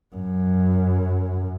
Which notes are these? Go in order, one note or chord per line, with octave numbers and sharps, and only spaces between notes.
F#2